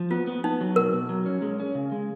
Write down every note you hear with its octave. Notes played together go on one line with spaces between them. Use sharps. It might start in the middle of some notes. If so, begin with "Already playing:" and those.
Already playing: F3
B3 F4
B3
B3 D#4
F#3
B2 A#4
B2
F#3
C#4
G#3
C#4
C#3
G#3